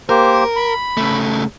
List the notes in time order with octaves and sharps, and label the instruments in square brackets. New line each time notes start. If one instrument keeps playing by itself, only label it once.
[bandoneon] A#3 G4 C5 [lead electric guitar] A#4
[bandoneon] B5
[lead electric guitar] C#3 A3